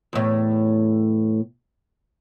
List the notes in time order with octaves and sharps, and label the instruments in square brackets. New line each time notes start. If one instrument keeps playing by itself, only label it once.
[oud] E2 A2